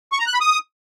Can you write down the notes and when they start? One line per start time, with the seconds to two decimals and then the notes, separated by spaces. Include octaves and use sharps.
0.12 C#6
0.19 A#5
0.26 F#6
0.34 B5
0.41 D#6